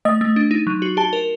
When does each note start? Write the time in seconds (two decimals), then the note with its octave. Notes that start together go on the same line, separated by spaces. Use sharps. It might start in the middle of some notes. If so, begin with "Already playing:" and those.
0.05 A3 D#5
0.21 A3
0.36 D4
0.51 D#4
0.67 F#3
0.82 F#4
0.97 G4 A5
1.13 A#4